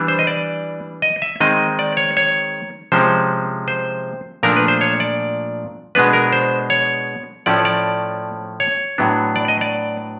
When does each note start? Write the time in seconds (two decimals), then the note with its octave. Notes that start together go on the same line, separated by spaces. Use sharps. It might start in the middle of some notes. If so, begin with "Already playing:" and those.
Already playing: E3 G3 B3 D4
0.08 C5
0.19 D#5
0.27 D5
1.02 D#5
1.22 E5
1.40 D#3 G#3 C4 D#5
1.79 D5
1.97 C#5
2.17 C#5
2.92 C3 F3 G#3 C#4 C5
3.68 C5
4.43 A#2 F3 A3 D4 A#4
4.56 B4
4.68 C5
4.81 C#5
5.00 D5
5.95 B2 G#3 B3 D4 B4
6.13 A#4
6.33 C5
6.70 C#5
7.46 A2 F3 A3 C#4 D5
7.65 D5
8.60 C#5
8.98 A2 F#3 B3 D4
9.36 D5
9.48 D#5
9.61 D5